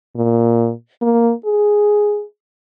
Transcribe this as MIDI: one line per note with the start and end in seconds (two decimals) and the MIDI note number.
0.16 0.72 46
1.02 1.33 58
1.46 2.24 68